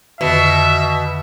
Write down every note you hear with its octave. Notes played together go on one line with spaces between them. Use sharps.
F2 B2 D3 D#3 E5